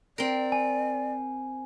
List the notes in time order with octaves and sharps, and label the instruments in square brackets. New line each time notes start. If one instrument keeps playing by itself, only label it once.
[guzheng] C4 A#4 [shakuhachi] D5
[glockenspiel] G#5